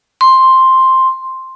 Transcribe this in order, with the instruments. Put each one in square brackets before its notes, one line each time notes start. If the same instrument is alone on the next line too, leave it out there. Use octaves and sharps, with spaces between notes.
[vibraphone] C6